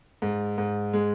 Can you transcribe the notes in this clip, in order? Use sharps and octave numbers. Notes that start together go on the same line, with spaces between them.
G#2
G#2
G#3